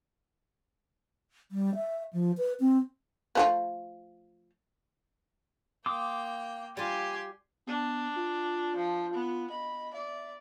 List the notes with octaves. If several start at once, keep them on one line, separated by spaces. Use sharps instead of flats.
G3
E5
F3
B4
C4
F3 A3 B3
A#3 G5 C6 D6 D#6
G3 F4 G4 G#5 C6
B3 D4
F4
F3
B3
D#5 B5
D5 E5